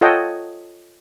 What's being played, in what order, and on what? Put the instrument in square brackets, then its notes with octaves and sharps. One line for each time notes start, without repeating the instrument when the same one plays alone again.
[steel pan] F4 A4 C#5 D#5 F#5 G5